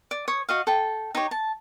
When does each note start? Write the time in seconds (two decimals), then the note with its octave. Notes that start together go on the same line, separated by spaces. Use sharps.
0.11 D5
0.28 C#5 D#6
0.49 F#4 D#5 F5
0.67 A4 G5
1.15 D#4 G4 C#5
1.31 A5